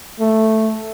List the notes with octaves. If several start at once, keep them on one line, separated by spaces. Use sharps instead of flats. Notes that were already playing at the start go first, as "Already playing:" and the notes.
A3